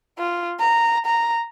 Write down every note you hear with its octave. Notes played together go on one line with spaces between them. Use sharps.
F4
A#5
A#5